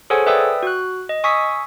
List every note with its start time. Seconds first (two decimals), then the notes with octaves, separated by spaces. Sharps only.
0.10 G#4 A4 C5 C#5 F#5 G#5
0.26 B4 D5 E5 G5 D#6 E6
0.63 F#4 F#6
1.09 D#5
1.24 G#5 C#6 D#6 E6 B6